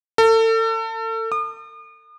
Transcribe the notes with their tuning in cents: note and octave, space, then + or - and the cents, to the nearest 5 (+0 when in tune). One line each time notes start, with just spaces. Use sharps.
A4 +35
D#6 -45